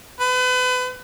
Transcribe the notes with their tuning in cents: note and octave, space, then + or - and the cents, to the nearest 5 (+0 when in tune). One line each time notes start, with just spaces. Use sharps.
B4 +35